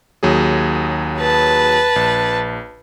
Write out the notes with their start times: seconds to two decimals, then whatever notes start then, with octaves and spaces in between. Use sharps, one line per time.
0.23 D#2 F#3 G#4
1.18 B4 A5
1.96 A#1